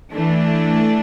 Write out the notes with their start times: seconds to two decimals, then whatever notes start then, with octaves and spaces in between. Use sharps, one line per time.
0.13 E3 A3 D4